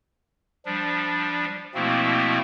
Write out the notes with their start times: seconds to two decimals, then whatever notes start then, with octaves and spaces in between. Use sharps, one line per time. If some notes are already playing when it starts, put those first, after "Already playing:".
0.66 F3 G3 D4
1.75 B2 F3 A3 A#3 C4 E4